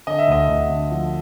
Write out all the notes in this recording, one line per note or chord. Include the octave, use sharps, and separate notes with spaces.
D3 D#5
E5
D2 D#5
D2
D3
F3